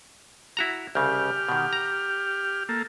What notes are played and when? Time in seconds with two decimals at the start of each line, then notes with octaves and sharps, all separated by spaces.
0.57 E4 F#4 A#5
0.95 C2 C#3 G4 F6
1.49 B2 D#3
1.73 A#5
2.69 A#3 A4